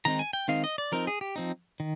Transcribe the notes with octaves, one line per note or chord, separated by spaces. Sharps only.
D#3 G#3 C4 D#4 A#5
G#5
G5
D#3 G#3 C4 D#4 F5
D#5
D5
F3 C4 D#4 A#4
G#4
G4
F3 C4 D#4
D#3